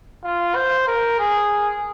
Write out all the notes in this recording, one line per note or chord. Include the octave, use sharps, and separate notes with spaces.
F4
C5
A#4
G#4